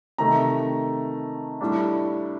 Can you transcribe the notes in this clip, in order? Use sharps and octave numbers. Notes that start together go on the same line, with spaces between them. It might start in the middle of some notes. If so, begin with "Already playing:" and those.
C3 D#3 A3 A#5
A2 G3 D4